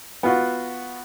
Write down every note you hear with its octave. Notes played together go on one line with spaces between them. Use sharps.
B3 F4 F#4